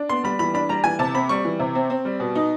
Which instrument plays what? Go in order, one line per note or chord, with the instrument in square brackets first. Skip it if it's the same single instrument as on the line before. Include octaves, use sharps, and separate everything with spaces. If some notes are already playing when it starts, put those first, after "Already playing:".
Already playing: [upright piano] D4
[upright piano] B3 [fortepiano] C6
[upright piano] G3 [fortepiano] B5
[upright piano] E3 [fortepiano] B5
[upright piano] D4 [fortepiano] B5
[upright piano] G3 [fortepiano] A#5
[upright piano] E3 [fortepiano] G#5
[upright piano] C3 [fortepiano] A5
[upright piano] C4 [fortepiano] B5
[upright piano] G3 [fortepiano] C#6
[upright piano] E3
C3
C4
C4
G3
B2
D#4